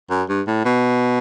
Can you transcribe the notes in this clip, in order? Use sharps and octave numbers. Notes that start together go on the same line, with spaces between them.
F#2
G2
A2
B2